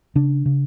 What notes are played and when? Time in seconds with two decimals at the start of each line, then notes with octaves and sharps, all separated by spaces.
0.15 C#3 D4
0.46 C#3